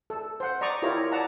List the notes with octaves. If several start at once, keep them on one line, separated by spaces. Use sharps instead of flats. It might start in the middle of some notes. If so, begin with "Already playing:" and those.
A4
C5 F#5
D5 A#5 C#6 D#6
E4 F4 G4 A#4 C#5 A#5
D5 F#5 A5 A#5